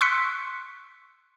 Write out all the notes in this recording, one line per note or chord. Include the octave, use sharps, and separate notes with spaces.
C6 C#6 E6 F#6 B6 C#7